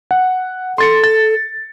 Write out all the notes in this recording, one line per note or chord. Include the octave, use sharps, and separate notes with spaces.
F#5
A4 C6 A6 C#7
A6